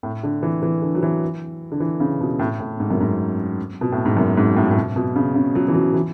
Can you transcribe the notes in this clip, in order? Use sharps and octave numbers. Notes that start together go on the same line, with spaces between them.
A2
D3
E3
E3
D3
F#3
E3
D3
E3
C#3
B2
A2
A2
G#2
F#2
G#2
B2
A2
G#2
F#2
G#2
A2
A2
B2
B2
C#3
C#3
F#3
E3
F#3
E3